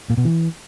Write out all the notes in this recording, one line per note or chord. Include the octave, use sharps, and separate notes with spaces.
A#2
B2
E3